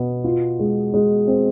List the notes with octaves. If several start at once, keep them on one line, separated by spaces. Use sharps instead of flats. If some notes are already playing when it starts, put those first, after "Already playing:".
Already playing: B2 B3
F4
G#3
G#3
C4